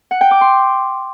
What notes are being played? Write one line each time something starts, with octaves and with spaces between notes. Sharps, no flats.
F#5
G5
D6
C6